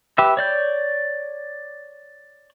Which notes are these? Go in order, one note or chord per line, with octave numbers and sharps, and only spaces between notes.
G4 B4 E5
C#5 D5 G6